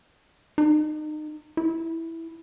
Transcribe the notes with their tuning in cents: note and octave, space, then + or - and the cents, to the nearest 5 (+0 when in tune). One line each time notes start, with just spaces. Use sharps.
D#4 -30
E4 -5